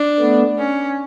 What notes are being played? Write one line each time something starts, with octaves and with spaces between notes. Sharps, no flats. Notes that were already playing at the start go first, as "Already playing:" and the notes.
Already playing: D4
A3 B3
C#4